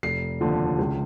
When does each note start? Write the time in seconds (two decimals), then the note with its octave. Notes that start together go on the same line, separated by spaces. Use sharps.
0.03 F1 C7
0.41 D#2 D3 F3
0.79 C#2